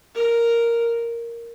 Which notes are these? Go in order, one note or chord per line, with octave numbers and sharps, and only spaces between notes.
A#4